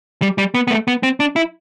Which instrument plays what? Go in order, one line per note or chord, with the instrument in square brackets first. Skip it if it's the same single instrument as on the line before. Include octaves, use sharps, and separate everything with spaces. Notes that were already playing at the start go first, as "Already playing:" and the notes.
[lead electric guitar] G3
G3
B3
B3
A3
B3
C4
D4
E4